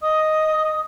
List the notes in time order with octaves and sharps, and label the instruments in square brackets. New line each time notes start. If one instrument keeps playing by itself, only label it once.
[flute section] D#5 D#6